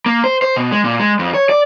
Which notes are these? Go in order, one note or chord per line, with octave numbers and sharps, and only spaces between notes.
A#3
C5
C5
B2
G#3
A#2
G#3
F2
C#5
D5